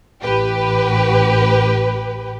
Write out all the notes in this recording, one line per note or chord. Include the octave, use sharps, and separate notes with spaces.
A1 G4 B4